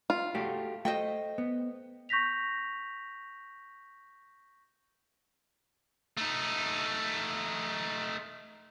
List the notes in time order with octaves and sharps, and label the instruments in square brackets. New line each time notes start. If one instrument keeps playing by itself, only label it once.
[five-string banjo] F4
[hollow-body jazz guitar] A3 F#4 G4
[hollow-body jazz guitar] A3 [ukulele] C5 D#5 G5
[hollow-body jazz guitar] B3
[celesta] C#6 G6 A#6 B6 F7
[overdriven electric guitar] A3 D#4